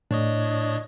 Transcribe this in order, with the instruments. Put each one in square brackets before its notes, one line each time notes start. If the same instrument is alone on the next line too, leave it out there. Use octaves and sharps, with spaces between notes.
[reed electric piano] A2 [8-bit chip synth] D4 C#5 D#5